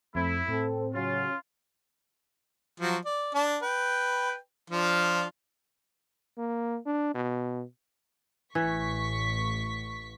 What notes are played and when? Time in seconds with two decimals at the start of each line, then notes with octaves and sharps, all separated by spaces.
0.15 F2 A3 C4 E4
0.48 A2 C4 A4
0.94 C#3 F#3 C#4 F4
2.80 F3 F#3 F#4
3.05 D5
3.34 D4 A5
3.62 B4 G5
4.70 F3 D4 F4
6.38 A#3
6.86 D4
7.15 B2
8.55 A1 E3 C#6 B6